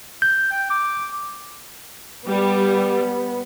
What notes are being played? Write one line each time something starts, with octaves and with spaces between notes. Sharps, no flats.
G6
G5
D6
G3 B3